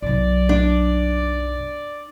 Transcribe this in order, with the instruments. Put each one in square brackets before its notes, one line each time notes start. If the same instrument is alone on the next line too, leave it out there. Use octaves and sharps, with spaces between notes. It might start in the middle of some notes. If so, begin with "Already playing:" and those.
[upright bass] B1 F#2 [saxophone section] D5
[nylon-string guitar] D4